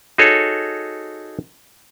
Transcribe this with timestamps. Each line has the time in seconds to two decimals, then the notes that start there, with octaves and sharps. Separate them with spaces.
0.18 D#4 F#4 G#4 A4 C#5